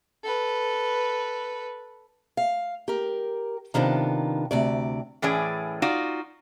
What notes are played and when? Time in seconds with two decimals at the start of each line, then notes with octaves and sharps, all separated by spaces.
0.24 A4 B4
2.37 F5
2.88 G4 A#4
3.74 C3 D#3 B3 D4 F4
4.51 D2 C3 D5
5.22 A2 E3 C#4 G#4 D5
5.82 D#4 F4 F#4 D5